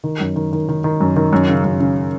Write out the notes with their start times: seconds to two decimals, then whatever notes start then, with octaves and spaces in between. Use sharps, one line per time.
0.04 D#3
0.20 F#2
0.36 D#3
0.53 D#3
0.69 D#3
0.84 D#3
1.00 F#2
1.16 D#3
1.33 F#2
1.48 C#3
1.64 F#2
1.80 C#3